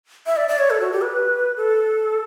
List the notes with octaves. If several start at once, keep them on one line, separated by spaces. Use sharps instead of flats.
E5
D5
D5
C#5
A4
F#4
G4
B4
A4